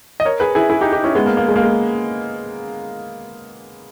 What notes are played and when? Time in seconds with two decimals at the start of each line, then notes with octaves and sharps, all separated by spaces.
0.20 D#5
0.25 A#4 C#5
0.40 G#4 B4
0.55 E4 G#4
0.70 E4 G#4
0.81 D#4 G4
0.92 D#4 G4
1.04 C#4 E4
1.15 G#3 B3
1.26 A#3
1.37 A#3
1.48 G#3
1.56 A#3
1.63 G#3